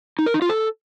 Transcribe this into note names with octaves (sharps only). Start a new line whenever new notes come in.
D#4
A#4
D#4
F4
A4